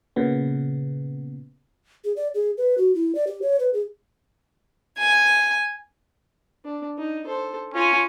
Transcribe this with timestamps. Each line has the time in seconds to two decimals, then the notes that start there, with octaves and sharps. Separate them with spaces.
0.16 A#2 C#3 B3
2.04 G#4
2.16 D5
2.34 G#4
2.57 B4
2.78 F#4
2.95 E4
3.15 D5
3.27 G4
3.42 C#5
3.60 B4
3.74 G#4
4.98 G#5
6.65 D4
6.98 D#4
7.26 A4 C5
7.74 C#4 F4 G#5